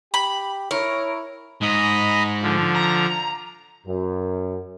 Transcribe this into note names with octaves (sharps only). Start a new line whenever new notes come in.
G4 B5
E4 A#4 C#5
G#2 D#5 A#5 B5
D3 F3
A#5
F#2